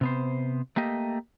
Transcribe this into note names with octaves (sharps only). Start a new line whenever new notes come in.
C3 B3 C5
A3 A#3 G4 D#5